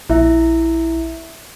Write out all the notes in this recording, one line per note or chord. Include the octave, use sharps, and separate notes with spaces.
A#1 E4 E5